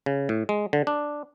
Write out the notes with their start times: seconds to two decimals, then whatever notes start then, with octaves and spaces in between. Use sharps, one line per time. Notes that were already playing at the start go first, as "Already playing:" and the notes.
0.06 C#3
0.29 A2
0.49 G#3
0.73 D3
0.87 D4